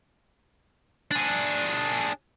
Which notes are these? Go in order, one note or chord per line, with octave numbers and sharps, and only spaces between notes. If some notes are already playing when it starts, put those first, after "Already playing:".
D4 G#4